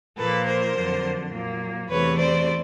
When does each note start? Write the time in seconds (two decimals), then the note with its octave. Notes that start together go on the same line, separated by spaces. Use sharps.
0.17 A#2 F3 A#3 A4 B4
0.46 A#4 C5
0.75 F2 D3 F#3
1.33 A#2 F#3 A#3
1.89 E2 C3 E3 A3 B4 C#5
2.18 C5 D5